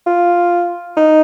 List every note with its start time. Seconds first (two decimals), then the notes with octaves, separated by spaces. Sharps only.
0.06 F4
0.97 D#4